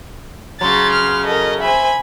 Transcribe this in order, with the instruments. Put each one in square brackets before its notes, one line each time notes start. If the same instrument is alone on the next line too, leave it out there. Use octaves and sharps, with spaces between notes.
[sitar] C#3 F#3 [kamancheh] C6 [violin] A6
[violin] F6
[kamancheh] A4 A#4 [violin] D#5
[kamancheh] C5 E5 [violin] G#5 B5